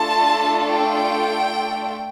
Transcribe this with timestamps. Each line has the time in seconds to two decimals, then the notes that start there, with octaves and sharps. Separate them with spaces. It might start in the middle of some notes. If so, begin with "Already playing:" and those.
Already playing: A3 D4 F4 A4 A5
0.71 G5